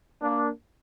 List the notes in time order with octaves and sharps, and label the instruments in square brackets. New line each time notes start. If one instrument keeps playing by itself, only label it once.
[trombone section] A#3 D4